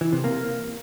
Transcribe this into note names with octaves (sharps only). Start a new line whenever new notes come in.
E3
C3
A#3